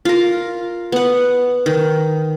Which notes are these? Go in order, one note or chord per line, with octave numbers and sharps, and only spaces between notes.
F4 A#4
B3 F#5
D#3